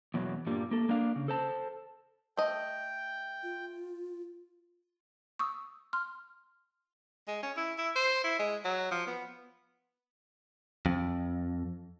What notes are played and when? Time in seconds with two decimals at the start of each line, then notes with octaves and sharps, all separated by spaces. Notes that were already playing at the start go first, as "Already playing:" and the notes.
0.14 E2 B2 F#3
0.47 G2 A#2 G3
0.71 A#3 A4
0.89 A#3 D4 F5
1.16 C#3
1.28 A4 C5 A5
2.37 A3 D#5 G5
3.43 F4
5.39 C#6 D#6 E6
5.93 C6 F6
7.28 G#3
7.43 C#4
7.57 E4
7.78 E4
7.96 C5
8.24 E4
8.39 G#3
8.64 F#3
8.91 F3
9.07 B3
10.86 F2